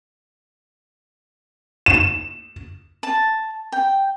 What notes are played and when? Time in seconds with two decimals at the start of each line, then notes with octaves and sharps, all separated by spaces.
1.86 E7
3.03 A5
3.72 G5